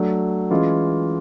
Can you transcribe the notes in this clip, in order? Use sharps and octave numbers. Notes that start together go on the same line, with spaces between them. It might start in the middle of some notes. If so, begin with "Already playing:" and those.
Already playing: F#3 A3 D4
E3 G#3 C#4 F4